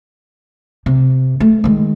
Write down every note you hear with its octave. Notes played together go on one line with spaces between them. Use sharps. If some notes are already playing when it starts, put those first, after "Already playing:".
C3
A3
D#3 G#3